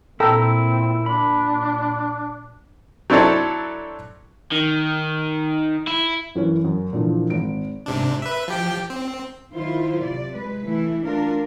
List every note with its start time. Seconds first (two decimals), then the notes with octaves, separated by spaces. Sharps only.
0.20 A#2 C4 E4 A4 G5 A#5 E6
1.06 D4 B5
3.10 F#3 C4 D4 E4 A4 C#5
4.52 D#3
5.87 E4
6.35 F#2 E3 C#4
6.64 F#2
6.93 A#2 D3 E3 F3
7.30 G#1 D7
7.86 G#2 C3 D4
8.22 B4 E5
8.48 F3 G4 G5
8.90 C4
9.53 D#3 F#3 E4 F4 C5
10.03 C3 D5
10.33 G#3 B4
10.65 E3 A3 E4
11.04 A3 D4 F4 A#4